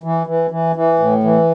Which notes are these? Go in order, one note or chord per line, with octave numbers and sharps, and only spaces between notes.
E3
E3
E3
E3
A2
E3